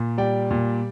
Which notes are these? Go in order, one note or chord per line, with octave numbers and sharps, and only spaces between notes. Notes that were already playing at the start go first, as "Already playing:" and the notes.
Already playing: A#2
G3 D5 G5
A#2